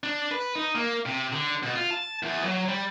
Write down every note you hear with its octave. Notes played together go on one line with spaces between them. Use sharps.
D4
B4
D#4
A#3
C3
D3
B2
F4
A5
E2
F#3
G3